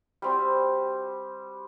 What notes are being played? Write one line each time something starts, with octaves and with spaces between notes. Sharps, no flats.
G3 C4 F#4